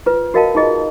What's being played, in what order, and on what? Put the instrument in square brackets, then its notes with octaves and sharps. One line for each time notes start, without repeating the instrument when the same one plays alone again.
[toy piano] F4 B4
F#4 A#4 D#5 F5 G5 A5
D#4 F4 G#4 D#5